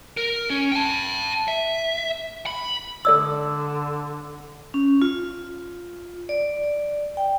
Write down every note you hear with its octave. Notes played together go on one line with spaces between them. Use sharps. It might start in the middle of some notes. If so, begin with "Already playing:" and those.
A#4
C#4
G5 A5
E5
B5
D3 A4 D5 E6
C#4
F4
D5
G5